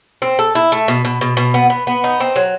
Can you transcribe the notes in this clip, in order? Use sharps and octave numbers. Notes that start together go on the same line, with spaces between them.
C4
A4
E4
A3
B2
B2
B2
B2
B3
B3
B3
D#4
C4
F#3